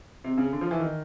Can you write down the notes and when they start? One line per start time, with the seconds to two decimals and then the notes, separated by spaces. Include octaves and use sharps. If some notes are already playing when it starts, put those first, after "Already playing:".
0.24 C3
0.38 C#3
0.52 D3
0.61 F3
0.71 E3
0.80 D#3